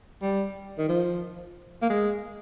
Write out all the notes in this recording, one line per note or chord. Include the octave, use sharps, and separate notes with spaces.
G3
D#3
F3
A#3
G#3